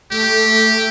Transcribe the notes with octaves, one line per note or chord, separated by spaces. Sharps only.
A3 G4